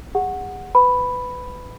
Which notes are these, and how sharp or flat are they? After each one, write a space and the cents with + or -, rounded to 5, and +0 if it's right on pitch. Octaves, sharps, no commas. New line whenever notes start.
G#4 -40 F#5 +0
B4 +20 B5 +0